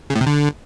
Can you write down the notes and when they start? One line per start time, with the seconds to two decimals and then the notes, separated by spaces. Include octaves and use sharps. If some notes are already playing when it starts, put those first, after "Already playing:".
0.10 C#3
0.15 A2
0.21 C3
0.26 D3